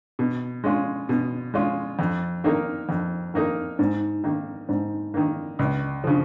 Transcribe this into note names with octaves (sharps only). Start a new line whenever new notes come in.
B2
G#3 C#4 F4
B2
G#3 C#4 F4
F2
D#3 A#3 D#4 A#4
F2
D#3 A#3 D#4 A#4
G#2
D#3 A#3
G#2
D#3 A#3
C#2
C#3 F3